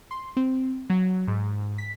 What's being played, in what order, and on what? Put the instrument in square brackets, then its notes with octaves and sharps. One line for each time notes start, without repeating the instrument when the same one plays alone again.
[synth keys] C6
C4
F#3
G#2
B6